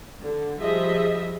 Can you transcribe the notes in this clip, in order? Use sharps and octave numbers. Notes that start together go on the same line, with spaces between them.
D3
F3 G3 G#4 D#5 E5